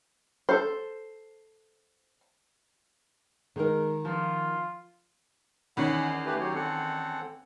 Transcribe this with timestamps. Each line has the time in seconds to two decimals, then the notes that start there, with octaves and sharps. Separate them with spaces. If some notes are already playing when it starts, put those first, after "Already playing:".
0.49 A4 C5
3.56 D#3 G#3 D#4 A#4
4.05 F3 F4
5.77 E2 D#3 C#4 F#5 B5
6.26 A3 G4 B4
6.40 F#3 G4 C#5
6.55 C4 A4 F#5